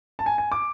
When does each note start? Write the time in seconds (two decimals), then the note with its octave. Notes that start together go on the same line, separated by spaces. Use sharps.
0.19 A5
0.26 G#5
0.38 G#5
0.52 D6